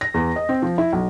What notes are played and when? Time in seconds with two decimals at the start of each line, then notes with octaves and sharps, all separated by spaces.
0.01 A#6
0.14 E2
0.36 D#5
0.49 C4
0.62 F3
0.78 E4
0.93 B1